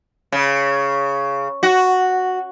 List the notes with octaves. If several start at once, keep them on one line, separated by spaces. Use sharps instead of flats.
C#3
F#4